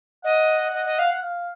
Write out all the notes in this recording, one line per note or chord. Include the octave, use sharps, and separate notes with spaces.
D#5 F#5
D#5
D#5
F5
F5